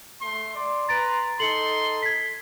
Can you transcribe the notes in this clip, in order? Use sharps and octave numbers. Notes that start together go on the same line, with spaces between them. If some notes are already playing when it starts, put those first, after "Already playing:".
A3 C6
D5 C6
B4 A#5 A6 D7
D#4 A4 C6 A6 C#7 F#7
G#6 B6